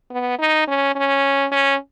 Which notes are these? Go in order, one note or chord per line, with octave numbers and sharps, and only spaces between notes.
B3
D#4
C#4
C#4
C#4